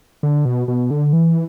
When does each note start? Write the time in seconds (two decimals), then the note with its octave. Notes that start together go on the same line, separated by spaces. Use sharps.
0.23 D3
0.45 B2
0.68 B2
0.91 D3
1.13 E3